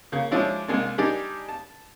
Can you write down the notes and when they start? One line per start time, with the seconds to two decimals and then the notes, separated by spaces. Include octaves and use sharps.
0.12 C#3 A#3
0.31 F3 G#3 C#4 D4 E4 F#4
0.68 C2 G#3 A#3 D4
0.98 G3 D4 D#4 G4 G#4
1.49 A5